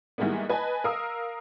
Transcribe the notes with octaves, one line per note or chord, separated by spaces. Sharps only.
D#3 E3 G3 G#3 A#3 B3
B4 D#5 G#5 A5
A#4 F5 D#6 E6